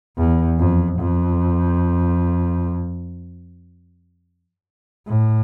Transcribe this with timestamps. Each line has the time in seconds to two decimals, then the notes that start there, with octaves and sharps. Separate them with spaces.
0.18 E2
0.59 F2
1.00 F2
5.08 A2